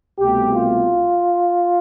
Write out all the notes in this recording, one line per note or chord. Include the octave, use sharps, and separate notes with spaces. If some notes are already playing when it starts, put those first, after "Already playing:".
C2 B2 A3 G4
F4